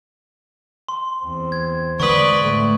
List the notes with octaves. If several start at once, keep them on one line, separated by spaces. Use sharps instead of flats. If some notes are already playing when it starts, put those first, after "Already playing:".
C6
E2 C4
G#6
D3 G#3 B4 D5 C#6 D#6
A2 A3